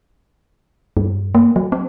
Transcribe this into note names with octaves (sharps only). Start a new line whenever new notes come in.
G2
A#3
F#3
C4